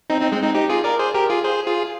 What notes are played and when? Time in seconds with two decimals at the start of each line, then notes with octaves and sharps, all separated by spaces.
0.10 C4 D#4
0.21 C4 D#4
0.32 G#3 C4
0.43 C4 D#4
0.55 D#4 G4
0.69 F4 G#4
0.84 A#4 D5
0.99 G#4 C5
1.14 G4 A#4
1.30 F4 G#4
1.44 G#4 C5
1.67 F4 G#4